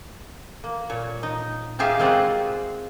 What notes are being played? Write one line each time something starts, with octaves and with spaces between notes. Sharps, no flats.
A#3
A#2 C#5
D#4
D#4 F4 G4 G#4 E5 F5
G#3 A#3 C4 F4 F#4 F#5